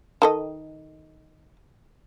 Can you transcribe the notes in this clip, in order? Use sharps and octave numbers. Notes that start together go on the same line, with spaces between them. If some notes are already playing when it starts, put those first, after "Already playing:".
D#3 A4 D#5